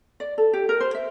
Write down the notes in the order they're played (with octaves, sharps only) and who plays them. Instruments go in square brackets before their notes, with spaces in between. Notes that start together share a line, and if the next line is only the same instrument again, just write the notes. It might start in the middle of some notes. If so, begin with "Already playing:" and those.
[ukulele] D5
A4
G4
A#4
C5
E5